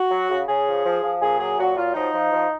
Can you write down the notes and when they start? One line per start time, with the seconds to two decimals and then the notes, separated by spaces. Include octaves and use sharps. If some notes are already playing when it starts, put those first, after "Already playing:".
Already playing: F#4
0.11 F#3
0.30 C#3
0.48 C#3 G#4
0.67 F3
0.85 F3
1.03 F3
1.22 A#2 G#4
1.40 F#3 G#4
1.58 A#2 F#4
1.76 F#3 F4
1.94 F3 D#4
2.13 F3
2.32 F3